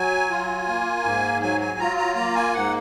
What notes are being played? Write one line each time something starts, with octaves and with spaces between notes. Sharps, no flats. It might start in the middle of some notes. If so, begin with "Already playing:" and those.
Already playing: F#3 G#5
F4
A#3
G#2
F#3 G#5
G#5
F4 A#5
A#5
A#3 A#5
G#5
G#2 F#5